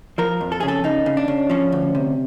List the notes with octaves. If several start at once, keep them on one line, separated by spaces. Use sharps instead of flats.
F3 A#4
F2
A4
C#3 G#4
A4
C#3 D#4
C#3
D4
C#3
F3 C#4
D2
C3